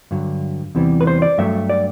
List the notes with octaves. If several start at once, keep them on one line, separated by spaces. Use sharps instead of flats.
G2 D3 F#3
E2 C3 E3 G3
B4
C5
D5
G2 F#3 A3 E5
D5